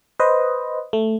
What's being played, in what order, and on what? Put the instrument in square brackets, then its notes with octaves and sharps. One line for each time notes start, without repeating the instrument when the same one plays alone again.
[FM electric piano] B4 C5 D#5
A3